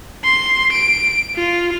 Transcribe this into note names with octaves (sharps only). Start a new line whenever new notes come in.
C6
D7
F4